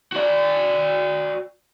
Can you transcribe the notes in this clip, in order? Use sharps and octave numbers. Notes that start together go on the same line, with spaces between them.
F#4 D5